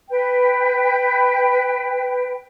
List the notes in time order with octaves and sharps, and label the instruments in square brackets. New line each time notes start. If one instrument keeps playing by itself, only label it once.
[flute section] B4 G5